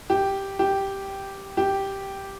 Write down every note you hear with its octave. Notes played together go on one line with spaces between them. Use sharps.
G4
G4
G4